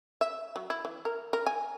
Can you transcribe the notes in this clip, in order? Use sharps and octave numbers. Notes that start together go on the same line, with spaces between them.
E5
F#3
E4
E3
A#4
A#4
G#5